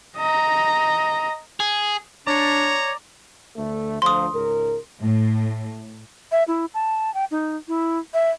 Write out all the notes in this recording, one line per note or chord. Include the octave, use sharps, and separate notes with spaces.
D#5 A#5
G#4
D4 C#5 D5 A#5
D2 A3
D2 F3 C6 D#6
C#2 G#2 A#4
A2
E5
E4
A5
G5
D#4
E4
E5